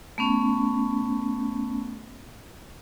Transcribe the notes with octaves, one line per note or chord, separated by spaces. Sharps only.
A3 B3 C#4